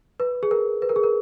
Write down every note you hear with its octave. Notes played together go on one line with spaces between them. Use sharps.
B4
G#4
A#4
B4
A#4
G#4
A#4